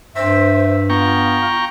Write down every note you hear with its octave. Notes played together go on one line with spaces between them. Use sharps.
G2 C5 E5
B3 F4 G5 A#5 C#6